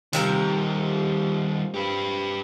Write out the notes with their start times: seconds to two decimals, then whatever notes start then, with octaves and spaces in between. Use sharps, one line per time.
0.13 C3 D#3 F3 G3 A#4
1.74 G4 B4